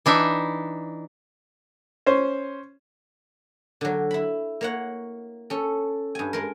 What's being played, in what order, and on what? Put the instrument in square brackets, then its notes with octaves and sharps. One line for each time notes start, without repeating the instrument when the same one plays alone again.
[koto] E3 D4 D#4 E5
[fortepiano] C#4 C5
[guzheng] D3 F#3
E4 B5
A#3 C#5 F#5
C#4 A4
G2 G#5
G#3 A#4